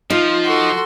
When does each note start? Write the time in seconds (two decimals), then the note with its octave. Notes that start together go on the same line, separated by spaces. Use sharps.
0.10 F3 D#4 F4
0.45 F#4 A4 C6